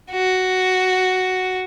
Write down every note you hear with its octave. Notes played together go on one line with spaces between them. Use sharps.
F#4